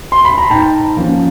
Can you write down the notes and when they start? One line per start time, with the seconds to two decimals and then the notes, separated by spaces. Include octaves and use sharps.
0.12 C6
0.25 B5
0.38 A#5
0.50 G#2 G5 A5
0.97 F3 A#3 C#4